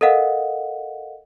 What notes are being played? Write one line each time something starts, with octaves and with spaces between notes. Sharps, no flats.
A4 A#4 D#5 F5 F#5